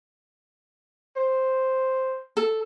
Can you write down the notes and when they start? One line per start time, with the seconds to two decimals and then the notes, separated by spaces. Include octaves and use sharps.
1.16 C5
2.37 A4